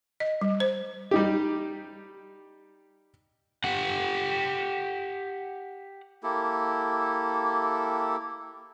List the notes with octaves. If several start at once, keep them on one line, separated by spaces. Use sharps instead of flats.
D#5
G3
C5
G3 D#4 G4
G4 F#5
A#3 E4 G4 A4